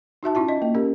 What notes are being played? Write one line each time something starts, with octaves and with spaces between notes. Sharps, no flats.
D#4 F#4 E5 A5
C#4 E4 F4 A5
D#5
A#3
C#4 G4 A#4